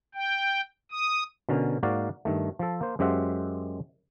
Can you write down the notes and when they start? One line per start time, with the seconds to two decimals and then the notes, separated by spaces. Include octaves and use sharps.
0.15 G5
0.92 D#6
1.49 B2 D3 C#4 A#4
1.83 G#2 A#3 F#4 D5 F5
2.25 G2 D#3 A3
2.59 F3 A4
2.81 A#3 C5
2.99 F#2 G#3 G4 C5 E5 F#5